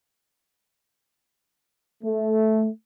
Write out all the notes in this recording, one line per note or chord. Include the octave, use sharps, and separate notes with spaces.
A3